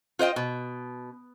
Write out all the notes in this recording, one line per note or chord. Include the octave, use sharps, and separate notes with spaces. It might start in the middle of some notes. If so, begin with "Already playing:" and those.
F4 C5 D#5 G5
B2